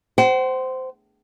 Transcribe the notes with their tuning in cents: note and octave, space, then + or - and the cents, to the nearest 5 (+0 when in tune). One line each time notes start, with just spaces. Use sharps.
C5 -10 F#5 +45